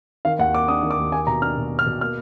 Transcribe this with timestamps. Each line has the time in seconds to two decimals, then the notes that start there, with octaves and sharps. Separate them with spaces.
0.25 D#3 F5
0.39 D#2 F#5
0.54 A#3 D6
0.68 D4 D#6
0.83 D#3
0.91 D6
0.98 D#2
1.12 A#3 G#5
1.27 B2 A#5
1.42 D4 F6
1.57 B2
1.72 A#3
1.79 F6
1.86 B2
2.01 A#3 F6